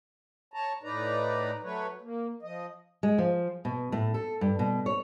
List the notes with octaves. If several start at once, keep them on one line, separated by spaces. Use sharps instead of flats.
C#5 A5 A#5
A2 D#4 B4 D5 A#5
F#3 A3 B4 C#5
A#3
F3 D#5
G#3
F3
B2
A2
A4
G2
B2
C#5